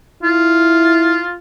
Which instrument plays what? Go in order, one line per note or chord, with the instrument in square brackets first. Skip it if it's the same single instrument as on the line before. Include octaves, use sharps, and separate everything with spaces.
[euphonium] E4 [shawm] F4